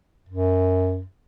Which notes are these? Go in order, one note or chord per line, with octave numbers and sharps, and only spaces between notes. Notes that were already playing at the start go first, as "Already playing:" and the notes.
F#2